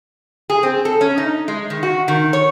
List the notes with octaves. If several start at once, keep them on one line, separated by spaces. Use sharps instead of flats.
G#4
C4
A4
C#4
D#4
G#3
D#3
F#4
D#3
C#5